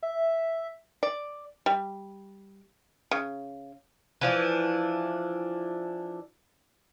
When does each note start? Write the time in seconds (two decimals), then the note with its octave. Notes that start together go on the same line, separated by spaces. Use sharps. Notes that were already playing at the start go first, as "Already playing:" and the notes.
0.03 E5
1.03 D5
1.66 G3
3.11 C#3
4.21 E3 F3 D4